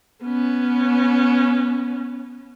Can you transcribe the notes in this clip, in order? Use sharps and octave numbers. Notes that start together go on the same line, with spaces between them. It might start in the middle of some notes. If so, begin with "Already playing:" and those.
B3 C#4